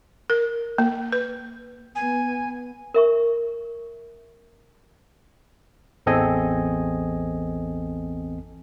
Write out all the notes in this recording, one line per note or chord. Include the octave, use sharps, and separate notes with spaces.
A#4
A#3
B4
B3 G#5
A#4 E5 C#6
A1 E2 C4 A4 D#5 G#5